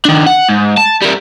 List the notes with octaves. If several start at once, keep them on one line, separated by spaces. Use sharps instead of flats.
D#3 D4
F#5
G#2
A5
G3 A#4